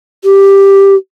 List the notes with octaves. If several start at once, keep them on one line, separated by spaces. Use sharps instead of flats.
G4